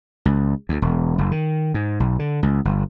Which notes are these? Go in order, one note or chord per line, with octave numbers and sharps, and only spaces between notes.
C#2
D2
E1
F#1
D#3
G#2
B1
D3
C#2
G1